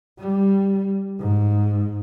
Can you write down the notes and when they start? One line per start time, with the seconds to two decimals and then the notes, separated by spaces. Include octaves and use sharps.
0.20 G3
1.20 G#2